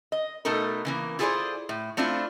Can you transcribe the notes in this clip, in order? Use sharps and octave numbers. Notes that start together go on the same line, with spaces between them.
D#5
B2 A3 D#4 A4 A#4
C#3 E3 A#3
E4 F4 G#4 A4 C5 D5
A2
A3 C4 D4 E4 F4